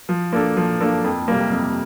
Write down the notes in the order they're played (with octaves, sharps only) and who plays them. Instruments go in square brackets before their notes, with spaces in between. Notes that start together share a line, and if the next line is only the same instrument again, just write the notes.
[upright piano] F3
A#3 D4 A4
F3
A#3 D4 A4
F2
C3 G3 A#3
F2